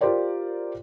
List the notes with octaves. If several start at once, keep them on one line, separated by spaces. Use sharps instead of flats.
F4 G4 A#4 C5 D5 G5